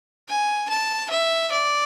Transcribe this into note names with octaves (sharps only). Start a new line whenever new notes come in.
G#5
A5
E5
D5